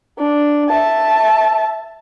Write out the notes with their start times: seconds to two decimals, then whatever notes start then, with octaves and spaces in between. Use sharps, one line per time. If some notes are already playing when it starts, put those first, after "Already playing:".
0.19 D4
0.69 E5 A5